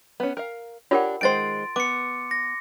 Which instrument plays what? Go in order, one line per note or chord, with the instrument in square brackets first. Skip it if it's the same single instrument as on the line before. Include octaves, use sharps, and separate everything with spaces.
[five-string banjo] B3 C#4
A#4 F5
[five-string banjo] D4 G4 C#5 [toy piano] F4 A#4 F#5
[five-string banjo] D#3 G#3 C5 [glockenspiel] C6 A6 D7
[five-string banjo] B3 [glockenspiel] D6 C#7
[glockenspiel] A#6